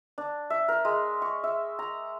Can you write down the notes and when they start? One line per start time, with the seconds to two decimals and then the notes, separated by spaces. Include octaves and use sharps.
0.18 D4
0.50 E5
0.68 A#4
0.85 G#3
1.22 C#6
1.44 E5
1.79 A#5